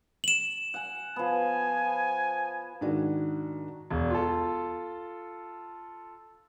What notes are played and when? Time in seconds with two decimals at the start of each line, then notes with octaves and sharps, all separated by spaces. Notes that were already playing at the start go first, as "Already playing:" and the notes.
0.24 E7 F#7
0.74 F#5 G#5
1.16 F3 B3 G#5
2.81 G#2 D#3 D4 F#4
3.90 E1
4.10 F4 A4